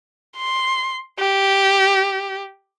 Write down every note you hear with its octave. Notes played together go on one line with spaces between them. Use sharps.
C6
G4